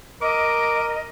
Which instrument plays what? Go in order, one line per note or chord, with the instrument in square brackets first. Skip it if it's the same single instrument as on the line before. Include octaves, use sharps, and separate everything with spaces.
[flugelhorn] A#4 [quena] D#5 [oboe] D6